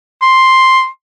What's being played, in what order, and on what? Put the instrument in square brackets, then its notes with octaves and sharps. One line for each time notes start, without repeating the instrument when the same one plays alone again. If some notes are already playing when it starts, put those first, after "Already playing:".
[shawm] C6